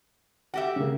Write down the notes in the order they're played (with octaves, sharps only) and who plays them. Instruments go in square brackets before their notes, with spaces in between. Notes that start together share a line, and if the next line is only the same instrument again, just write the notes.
[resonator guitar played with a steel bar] F#4 G4 E5 [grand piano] F#5
[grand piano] C#3 A#3